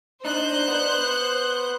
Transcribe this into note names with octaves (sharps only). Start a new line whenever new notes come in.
D4 D#4 C5 F#6 G6
B3